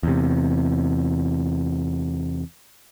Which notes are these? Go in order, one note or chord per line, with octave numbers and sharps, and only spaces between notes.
E2 C3